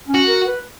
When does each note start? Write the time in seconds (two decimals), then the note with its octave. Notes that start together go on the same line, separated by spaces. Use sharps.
0.08 C#4
0.14 F#4
0.27 A#4
0.46 B4